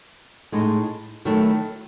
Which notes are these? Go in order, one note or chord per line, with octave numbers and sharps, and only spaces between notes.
A2 G#3 D#4
D#3 F#3 A3 E4